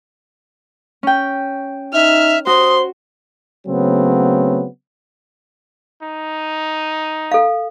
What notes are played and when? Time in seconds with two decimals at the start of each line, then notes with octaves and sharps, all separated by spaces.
1.03 C#4 G5
1.94 D#4 E5 F6
2.47 F#4 C5 C6 D#6
3.67 C#3 F#3 A3 B3 C4
6.02 D#4
7.31 A4 F5